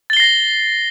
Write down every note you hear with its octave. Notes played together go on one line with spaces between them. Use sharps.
A6 A#6 C7 G7